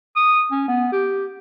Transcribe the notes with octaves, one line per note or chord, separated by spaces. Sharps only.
D#6
C#4
B3
G4